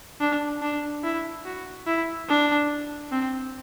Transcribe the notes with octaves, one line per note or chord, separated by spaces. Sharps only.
D4
D4
E4
F#4
E4
D4
C4